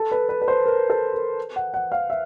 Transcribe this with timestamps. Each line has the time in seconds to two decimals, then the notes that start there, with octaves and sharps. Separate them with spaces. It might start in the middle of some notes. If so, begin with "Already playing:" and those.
Already playing: A4
0.12 B4
0.29 B4
0.42 B4
0.48 C5
0.66 A#4
0.90 A4
1.14 A#4
1.56 F#5
1.74 F#5
1.92 F5
2.10 E5